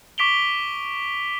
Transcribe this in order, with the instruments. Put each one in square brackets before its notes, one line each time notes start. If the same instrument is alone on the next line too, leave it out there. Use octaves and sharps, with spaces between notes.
[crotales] C#6 D6 B6 D7 F7 G7